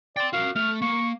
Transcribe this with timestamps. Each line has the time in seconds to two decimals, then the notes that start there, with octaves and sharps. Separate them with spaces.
0.17 D5 G5 C6
0.33 F#4 A#4 F5
0.56 A3 F6
0.82 A#3 C#6